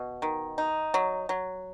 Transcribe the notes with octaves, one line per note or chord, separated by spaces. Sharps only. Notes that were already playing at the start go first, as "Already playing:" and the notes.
Already playing: B2
D#3
D#4
F#3
F#3